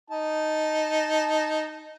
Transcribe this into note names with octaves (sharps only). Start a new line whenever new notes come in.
D#4 A5